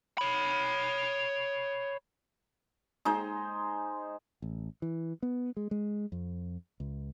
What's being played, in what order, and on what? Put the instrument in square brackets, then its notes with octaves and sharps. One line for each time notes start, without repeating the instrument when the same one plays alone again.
[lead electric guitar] C#5 B5
[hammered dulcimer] G#3 D#4 C5
[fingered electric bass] A1
E3
B3
G#3
G#3
F2
C#2